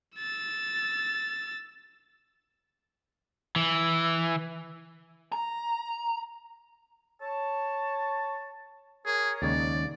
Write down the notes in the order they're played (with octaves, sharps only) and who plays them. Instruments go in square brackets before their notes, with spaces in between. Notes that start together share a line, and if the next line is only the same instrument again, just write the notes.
[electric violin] E6 A6
[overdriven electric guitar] E3
[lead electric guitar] A#5
[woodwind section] C#5 A5
[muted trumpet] G#4 [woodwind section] A#4 C#5
[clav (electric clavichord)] D#2 C#3 G#3 [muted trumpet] D5